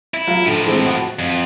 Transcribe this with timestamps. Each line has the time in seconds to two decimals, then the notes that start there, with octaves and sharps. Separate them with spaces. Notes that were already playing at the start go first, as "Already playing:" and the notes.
0.14 E4
0.27 F#3 F4
0.46 A2 D3 F3
0.66 E3 G#3 C4
0.86 F#4
1.19 F2